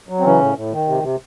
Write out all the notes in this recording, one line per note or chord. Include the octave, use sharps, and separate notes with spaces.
F#3
C4
C#3 E3 C#4
A2
A2
D#3
C3
C3